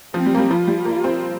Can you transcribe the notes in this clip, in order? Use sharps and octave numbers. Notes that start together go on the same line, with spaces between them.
F3 C4
G3
A#3
G3
F3 F4
G3
A#3
C4